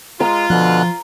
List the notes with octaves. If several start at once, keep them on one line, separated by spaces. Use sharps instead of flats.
G#3 F4 A#5
B2 D3 F3 F#6